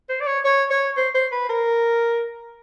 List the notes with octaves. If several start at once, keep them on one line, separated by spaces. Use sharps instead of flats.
C5
D5
C#5
C#5
C#5
C5
C5
B4
A#4